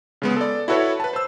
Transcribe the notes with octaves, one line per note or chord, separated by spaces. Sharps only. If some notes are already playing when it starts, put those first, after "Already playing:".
C#3 G#3 B3
A4 D5
E4 F#4 A4 B4 C#5
B4 A5
C5 E6